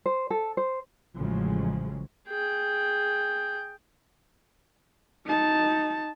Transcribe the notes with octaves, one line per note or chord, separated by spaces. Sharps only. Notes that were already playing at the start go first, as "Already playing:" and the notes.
C5
A4
C5
A1 A2 C#3 F3 F#3 G#3
G#4 G5
D#4 A5